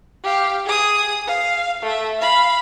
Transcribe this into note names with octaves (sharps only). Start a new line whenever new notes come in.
G4 F5
G#4 D#6
F5
A3 E5
F5 B5